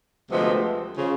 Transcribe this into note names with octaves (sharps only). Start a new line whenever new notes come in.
D2 C3 F3 G#3 B3
C#3 F3